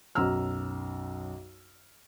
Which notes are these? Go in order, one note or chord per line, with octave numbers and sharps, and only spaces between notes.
B1 F#2 A#5 E6 F6